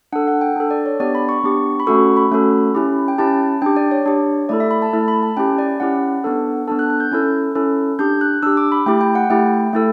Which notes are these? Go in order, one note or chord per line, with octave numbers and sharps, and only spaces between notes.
D4 A4 F#5
F#5
G5
D4 A4
D5
C#5
B3 D4 G4 D5
B5
C#6
B3 D4 G4
B5
A3 C#4 F#4 A4 C#6
B5
A3 C#4 F#4 A4
C#4 E4 G4
G5
C#4 E4 G4 A5
D4 G4 G5
D5
C#5
D4 G4
A3 E4 A4 D5
E5
B5
A5
A3 E4 A4
B5
A5
C#4 E4 G4 G5
D5
C#4 E4 G4 F#5
B3 D4 A4
B3 D4 A4 A5
F#6
F#6
G6
C#4 E4 A4
C#4 E4 A4
D4 G4 G6
F#6
D4 G4 E6
D6
B5
A3 E4 G4 G5
G5
F#5
A3 E4 G4 G5
A3 E4 A4